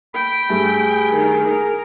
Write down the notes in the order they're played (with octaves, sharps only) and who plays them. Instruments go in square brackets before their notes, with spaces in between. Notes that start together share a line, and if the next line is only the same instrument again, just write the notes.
[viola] G5 [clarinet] B5
[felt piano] G2 G3 A3 [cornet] G#4
[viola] D#3
A#4